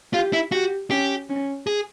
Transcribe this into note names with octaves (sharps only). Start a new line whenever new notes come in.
F4 G4
E4
F#4 G4
C#4 G4
C#4
G#4